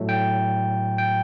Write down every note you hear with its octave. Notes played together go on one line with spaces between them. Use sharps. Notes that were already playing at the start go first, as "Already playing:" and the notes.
Already playing: A2 F#3 A3
G5
G5